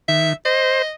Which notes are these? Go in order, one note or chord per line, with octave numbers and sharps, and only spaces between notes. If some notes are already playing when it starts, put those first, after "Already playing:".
D#3 E5
C5 D#5